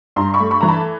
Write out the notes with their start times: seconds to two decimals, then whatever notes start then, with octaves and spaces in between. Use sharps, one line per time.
0.16 G2 A#5 C6
0.34 B5 C#6
0.40 A3
0.51 B5 C#6
0.61 E3 A#5
0.68 A5 B5